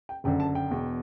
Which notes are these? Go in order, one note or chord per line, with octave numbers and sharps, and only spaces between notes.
G5
F#1 F#2 D3 G5
A5
G5
E1 E2 B2